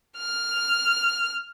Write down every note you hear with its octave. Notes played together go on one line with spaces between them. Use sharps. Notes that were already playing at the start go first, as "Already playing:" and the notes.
F6